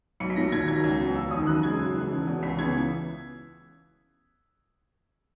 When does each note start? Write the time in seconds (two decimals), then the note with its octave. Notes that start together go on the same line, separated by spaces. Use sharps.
0.20 B1 C#7
0.30 B6
0.36 A#2 F#3 A#6
0.52 D#2 G#6
0.62 A#6
0.68 D#3 F#3 G#6
0.84 C#2
1.00 B2 F#3 B3
1.15 E1 E6
1.31 D#2 D#3 D#6
1.47 F#2 F#6
1.63 C#3 G#3 G#6
1.79 F#2
1.95 C#3 E3
2.11 E1
2.27 E2 C#3
2.43 C#2 B6
2.58 C#3 E3 B3 G#6